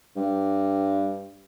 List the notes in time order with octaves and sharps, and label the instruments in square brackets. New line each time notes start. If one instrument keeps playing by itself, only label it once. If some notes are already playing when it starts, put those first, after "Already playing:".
[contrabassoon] G2